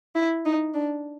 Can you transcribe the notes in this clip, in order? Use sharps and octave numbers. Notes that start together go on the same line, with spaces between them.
E4
D#4
D4